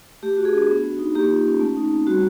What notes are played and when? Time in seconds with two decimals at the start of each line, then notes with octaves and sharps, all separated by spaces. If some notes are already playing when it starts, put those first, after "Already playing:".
0.22 A3 G4
0.38 F#4
0.45 G#4
0.54 D4
0.69 B3
0.84 F#4
0.99 D#4
1.15 A#3 G4
1.30 F4
1.46 C#4
1.61 A3
1.76 D#4
1.91 C4
2.07 G3 F#4